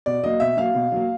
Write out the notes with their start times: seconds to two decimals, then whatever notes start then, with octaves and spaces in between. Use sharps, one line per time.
0.06 B2 D5
0.23 F#3 A#3 D#5
0.40 B2 E5
0.57 F#3 A#3 F5
0.75 B2
0.92 F#3 A#3